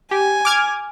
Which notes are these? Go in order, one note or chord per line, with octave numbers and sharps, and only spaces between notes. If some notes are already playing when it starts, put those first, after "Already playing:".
G4 G#5
D6 F6 G#6